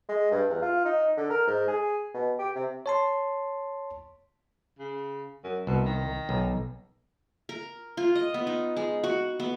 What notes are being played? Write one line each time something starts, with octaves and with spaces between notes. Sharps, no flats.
G#3
G2
E2
F4
D#4
D3
A#4
G#2
G#4
B2
G4
C3
C#5 A5 C6
C#3
F#2
C2 B2
D#3
B1
A#4
F4
D#5
B3
D#4
G#3
F#4
B3